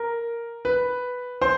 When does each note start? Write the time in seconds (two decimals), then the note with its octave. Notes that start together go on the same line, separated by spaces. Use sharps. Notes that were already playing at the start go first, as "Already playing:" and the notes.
Already playing: A#4
0.65 B4
1.42 C5